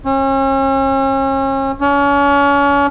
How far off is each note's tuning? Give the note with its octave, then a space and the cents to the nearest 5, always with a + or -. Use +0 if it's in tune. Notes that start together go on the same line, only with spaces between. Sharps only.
C#4 -40
C#4 +35